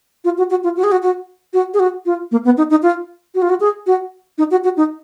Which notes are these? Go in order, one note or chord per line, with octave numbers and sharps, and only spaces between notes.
F4
F#4
F#4
F4
F#4
G#4
F#4
F#4
F#4
G#4
F#4
F4
A#3
B3
D#4
D#4
F4
F#4
F4
F#4
G#4
F#4
D#4
F#4
F#4
D#4